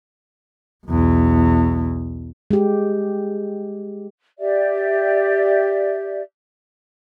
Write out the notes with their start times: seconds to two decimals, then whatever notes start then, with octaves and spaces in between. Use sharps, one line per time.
0.86 B1 E2
2.51 G#3 G4
4.39 G4 D5 E5